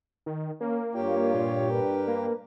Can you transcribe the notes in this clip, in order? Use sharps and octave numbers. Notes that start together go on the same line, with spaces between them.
D#3
A#3 C#4
G2 F4 G4 C#5 G5
A#2
D4 A#4 B4
A#3